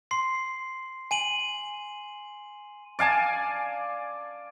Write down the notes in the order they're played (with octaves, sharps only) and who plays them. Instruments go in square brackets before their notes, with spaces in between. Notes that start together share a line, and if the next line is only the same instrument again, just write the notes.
[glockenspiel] C6 C7
G#5 D#7 F#7
[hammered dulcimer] D5 F5 G#5 A5